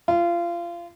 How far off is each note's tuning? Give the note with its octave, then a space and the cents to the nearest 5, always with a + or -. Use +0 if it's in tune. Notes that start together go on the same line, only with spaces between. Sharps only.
F4 -25